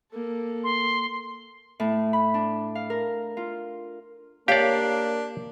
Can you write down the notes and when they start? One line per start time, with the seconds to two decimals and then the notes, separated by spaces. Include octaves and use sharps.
0.12 A#3 A4
0.64 C6
1.80 A2
2.13 B5
2.34 D4
2.75 F5
2.90 A#4
3.37 F4
4.48 A#3 D4 G4 C#5 D5 F5